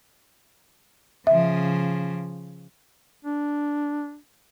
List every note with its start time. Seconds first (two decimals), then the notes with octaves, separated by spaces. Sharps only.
1.27 C#3 F3 E5
3.25 D4